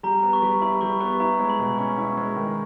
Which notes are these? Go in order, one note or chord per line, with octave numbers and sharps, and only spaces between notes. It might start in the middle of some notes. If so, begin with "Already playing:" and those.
G3 A#5
B3
C#6
G3
E4 B5
G3 C#6
B3 C#6
E4 A#5
G#3
B5
B2
C#4 C#6
E4
G#3
D#3